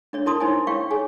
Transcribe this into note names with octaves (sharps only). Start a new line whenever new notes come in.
D4 C#5 D5
E4 A#4 D5 A5 C6 D#6
D#4 C5 C#5 G#5
E4
C#5 D5 F5 G5 C#6
G#4 C#5 G#5